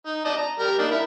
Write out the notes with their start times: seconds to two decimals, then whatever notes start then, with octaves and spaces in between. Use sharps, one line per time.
0.06 D#4
0.25 D5 D#5 A5
0.37 A#5
0.59 G3 A#4 A#5
0.79 A#3 D4 D#4
0.91 E4 A#4